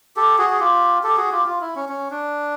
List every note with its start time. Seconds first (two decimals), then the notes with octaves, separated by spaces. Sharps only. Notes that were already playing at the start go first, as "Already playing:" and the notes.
0.16 G4 A4
0.38 F#4 G#4
0.50 G#4
0.59 F4 G4
1.03 G4 A4
1.17 F#4 G#4
1.31 F4 G4
1.46 F4
1.61 E4
1.76 C#4
1.89 C#4
2.11 D4